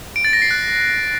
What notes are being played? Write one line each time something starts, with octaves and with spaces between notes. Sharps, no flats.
D7
A6
A#6
C7
F#6